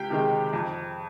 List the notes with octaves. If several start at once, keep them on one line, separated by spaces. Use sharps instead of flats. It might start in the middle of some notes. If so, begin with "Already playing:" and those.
Already playing: C#2 G4 G5
C3 D#3 G#3
F2